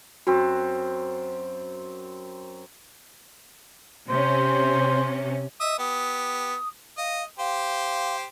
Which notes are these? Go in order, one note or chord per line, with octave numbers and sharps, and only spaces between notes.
F#2 C4 F#4
C3 C#4 C5
D#5 E5 D#6
B3 G4 D#6
D#5 F5
G4 C5 F5